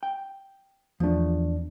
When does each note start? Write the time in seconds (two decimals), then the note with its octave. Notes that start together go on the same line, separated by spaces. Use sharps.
0.03 G5
1.00 E2 F3 A3 D4